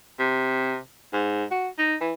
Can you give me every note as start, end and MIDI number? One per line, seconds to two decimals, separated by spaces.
0.19 0.78 48
1.13 1.44 44
1.51 1.68 66
1.79 1.95 63
2.01 2.13 52